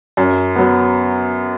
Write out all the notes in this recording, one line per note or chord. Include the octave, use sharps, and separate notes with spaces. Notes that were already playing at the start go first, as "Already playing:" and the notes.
F#2
F#3 B3